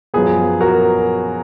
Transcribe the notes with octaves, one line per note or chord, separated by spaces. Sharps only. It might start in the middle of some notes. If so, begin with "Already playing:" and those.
F#2 F3 B3 G#4 B4
F#4 A#4